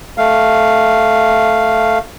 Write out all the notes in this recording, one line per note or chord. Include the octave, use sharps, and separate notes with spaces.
A3 F5